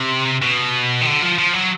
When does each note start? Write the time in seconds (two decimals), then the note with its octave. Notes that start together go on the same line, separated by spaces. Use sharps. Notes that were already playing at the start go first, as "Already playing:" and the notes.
Already playing: C3
0.42 B2
1.01 D#3
1.06 D3
1.22 F3
1.39 F3
1.54 F#3